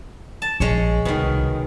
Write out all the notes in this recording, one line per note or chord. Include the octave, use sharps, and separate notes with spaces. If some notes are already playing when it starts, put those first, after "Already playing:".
A5
A#1 G#3 C#4 C#5
C2 B2 D#3